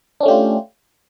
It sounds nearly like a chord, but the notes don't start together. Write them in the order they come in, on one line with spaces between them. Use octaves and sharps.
D4 C#4 A3 G4 F4